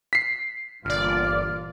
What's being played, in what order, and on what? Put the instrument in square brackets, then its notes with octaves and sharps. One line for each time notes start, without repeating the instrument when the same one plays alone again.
[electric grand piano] B6 C7
[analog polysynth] G1 D5 [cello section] A#2 E3 F4 [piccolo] F6